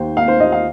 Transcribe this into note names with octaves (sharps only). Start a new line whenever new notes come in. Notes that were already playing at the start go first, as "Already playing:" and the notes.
Already playing: D#2 D#3 C5
A#3 F5
C5
D#2 D#5
F5